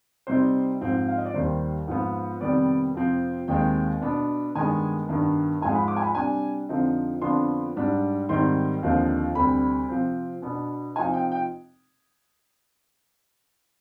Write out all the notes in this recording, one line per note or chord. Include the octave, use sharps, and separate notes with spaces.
C3 G3 C4 D#4 C5
G#2 F3 C4
F5
D#5
D5
D#2 D#3 G3 C5
G#2 F3 B3
F2 C3 D#3 G3 B3 D5
F2 C3 F3 C4
D#2 D#3 G#3 C4 G5
B2 B3 D4
G2 D#3 G#3 B3 G#5
G2 D#3 B3 D4
G#2 F3 G#3 G#5
B5
D6
G#5
B5
C3 G3 D4 G#5
F2 D3 F3 C4 D#4
F2 D3 F3 B3 D4 C6
G#2 G3 D4
G#2 D#3 G3 C4 D#4 C6
D#2 D3 F3 C4 D#4
D2 C3 G3 C4 B5
C3 F3 C4
B2 B3 D4
C3 F3 C4 D#4 G#5
G5
G5